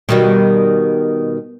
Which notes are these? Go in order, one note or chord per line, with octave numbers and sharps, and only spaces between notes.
B2 D#3 G3